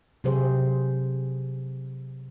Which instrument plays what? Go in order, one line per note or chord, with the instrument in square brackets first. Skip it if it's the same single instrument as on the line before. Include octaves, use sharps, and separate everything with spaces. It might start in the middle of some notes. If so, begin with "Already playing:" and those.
[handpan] C3 F#3 G4 G#4 C5